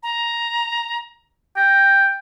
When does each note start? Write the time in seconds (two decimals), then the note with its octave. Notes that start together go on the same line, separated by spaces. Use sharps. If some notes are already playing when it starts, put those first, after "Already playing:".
0.03 A#5
1.57 G5 A#6